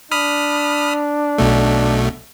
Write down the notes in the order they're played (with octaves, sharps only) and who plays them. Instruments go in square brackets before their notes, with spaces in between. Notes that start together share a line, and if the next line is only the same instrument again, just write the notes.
[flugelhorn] D4 [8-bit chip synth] B5 D#6 F6
[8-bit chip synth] B1 B2 A3